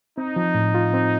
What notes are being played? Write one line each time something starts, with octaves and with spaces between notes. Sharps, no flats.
C4 D#4
F3
A2
F4
C4